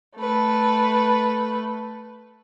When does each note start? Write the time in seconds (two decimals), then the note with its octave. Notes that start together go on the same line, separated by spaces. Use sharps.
0.16 A3 B4